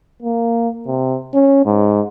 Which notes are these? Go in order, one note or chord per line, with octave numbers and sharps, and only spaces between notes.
A#3
C3
C#4
G#2